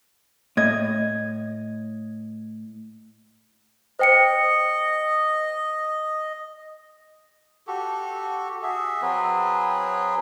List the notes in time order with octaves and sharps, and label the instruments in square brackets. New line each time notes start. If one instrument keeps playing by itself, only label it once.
[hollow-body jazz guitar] A2 [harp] D#5 G#6
[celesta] C5 G5 C#7 [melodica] D#5
[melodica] F#4 G4 A4
F#4 G#4 E5
F#3 C4 G#4 B4